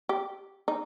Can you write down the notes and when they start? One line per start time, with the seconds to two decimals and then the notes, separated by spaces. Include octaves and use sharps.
0.09 G4
0.68 D#4